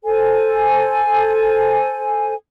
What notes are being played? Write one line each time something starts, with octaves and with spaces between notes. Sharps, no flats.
A4 C5 G#5